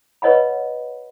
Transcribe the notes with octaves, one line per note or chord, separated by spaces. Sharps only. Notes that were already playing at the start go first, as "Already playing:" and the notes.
B4 C#5 D#5 F#5 B5